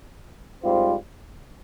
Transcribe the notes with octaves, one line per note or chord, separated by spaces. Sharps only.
G#2 G3 C4 F4